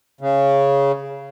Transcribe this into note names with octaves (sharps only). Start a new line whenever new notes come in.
C#3